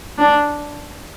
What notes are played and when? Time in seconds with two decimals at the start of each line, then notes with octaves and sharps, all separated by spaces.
0.18 D4